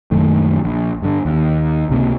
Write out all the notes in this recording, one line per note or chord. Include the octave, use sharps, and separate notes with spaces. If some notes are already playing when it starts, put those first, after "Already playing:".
A#1 F#2 D#3 A3
A#1
G2 D3
D#2
C#2 C3 A#3